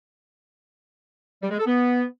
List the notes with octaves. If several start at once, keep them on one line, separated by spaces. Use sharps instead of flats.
G3
G#3
A4
B3